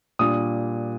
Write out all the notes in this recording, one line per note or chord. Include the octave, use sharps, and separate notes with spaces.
A#2 G3 D4 D#6